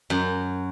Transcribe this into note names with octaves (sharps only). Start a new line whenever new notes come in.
F#2